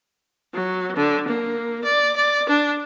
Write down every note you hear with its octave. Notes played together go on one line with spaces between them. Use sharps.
F#3
D3
A#3
D5
D5
D4